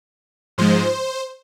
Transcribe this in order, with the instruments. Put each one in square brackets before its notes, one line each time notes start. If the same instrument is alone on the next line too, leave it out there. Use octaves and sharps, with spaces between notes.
[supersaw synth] G#2 F3 G#3 C5